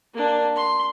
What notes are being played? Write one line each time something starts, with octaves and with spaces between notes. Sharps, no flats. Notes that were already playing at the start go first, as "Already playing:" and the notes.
A#3 D4
C6